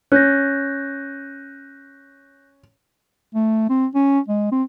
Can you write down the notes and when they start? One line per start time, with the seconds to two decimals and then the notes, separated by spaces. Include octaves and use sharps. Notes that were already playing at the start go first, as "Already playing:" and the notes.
0.12 C#4 F#6 G6 A#6
3.35 A3
3.69 C4
3.95 C#4
4.28 G#3
4.52 C4